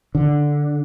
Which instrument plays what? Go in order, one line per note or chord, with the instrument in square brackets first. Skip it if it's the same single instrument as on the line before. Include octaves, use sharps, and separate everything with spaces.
[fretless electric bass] D3